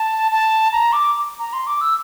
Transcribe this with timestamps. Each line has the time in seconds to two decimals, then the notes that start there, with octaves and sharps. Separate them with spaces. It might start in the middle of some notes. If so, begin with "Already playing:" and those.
Already playing: A5
0.32 A5
0.72 A#5
0.93 D6
1.39 A#5
1.53 C6
1.67 D6
1.81 E6